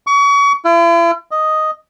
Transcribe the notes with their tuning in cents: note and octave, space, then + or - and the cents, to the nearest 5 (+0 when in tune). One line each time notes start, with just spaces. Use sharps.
C#6 +35
E4 +45
D#5 +0